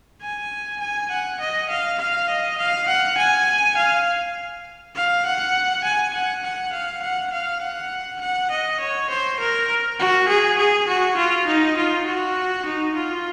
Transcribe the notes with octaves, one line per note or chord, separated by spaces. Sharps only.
G#5
G#5
F#5
D#5
F5
F5
D#5
F5
F#5
G#5
F5
F5
F#5
G#5
F#5
F#5
F5
F#5
F5
F#5
F#5
D#5
C#5
C5
A#4
F#4
G#4
G#4
F#4
F4
D#4
F4
F#4
D#4
F4